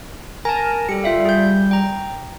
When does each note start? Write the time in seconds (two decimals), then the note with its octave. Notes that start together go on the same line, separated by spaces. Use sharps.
0.45 A#4 G#5 A5
0.89 G3 A4 C#7
1.04 F4 E5 F5
1.25 G#4 G6
1.71 G5 A#5